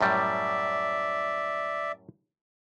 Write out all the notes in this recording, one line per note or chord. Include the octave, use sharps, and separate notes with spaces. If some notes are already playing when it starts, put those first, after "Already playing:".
F#2 A2 G3 D5 E5